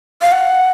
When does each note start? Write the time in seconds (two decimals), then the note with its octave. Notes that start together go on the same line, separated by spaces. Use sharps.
0.22 F5
0.32 F#5